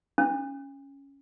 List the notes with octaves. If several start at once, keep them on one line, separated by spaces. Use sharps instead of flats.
C#4